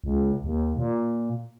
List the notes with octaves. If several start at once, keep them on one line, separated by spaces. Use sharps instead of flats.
C#2
D#2
A#2